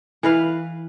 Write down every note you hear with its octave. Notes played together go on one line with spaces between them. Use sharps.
E3 B4 F5